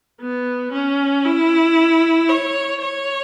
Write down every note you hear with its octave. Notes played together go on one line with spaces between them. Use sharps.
B3
C#4
E4
C#5
C#5